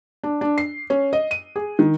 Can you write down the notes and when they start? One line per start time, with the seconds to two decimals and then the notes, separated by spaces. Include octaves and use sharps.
0.23 D4
0.41 D4
0.58 C7
0.90 C#4
1.13 D#5
1.31 D#7
1.56 G#4
1.79 D#3